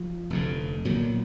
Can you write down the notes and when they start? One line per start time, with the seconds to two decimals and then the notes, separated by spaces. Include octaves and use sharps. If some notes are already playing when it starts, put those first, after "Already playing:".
Already playing: F3
0.30 F1 F2 D3
0.85 B1 A#2 D#3 F#3